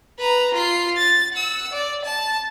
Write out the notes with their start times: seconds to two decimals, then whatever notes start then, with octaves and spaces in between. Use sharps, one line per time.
0.19 B4 A#5
0.54 F4 C7
0.97 A6
1.33 F#5 E6
1.73 D5
2.04 A5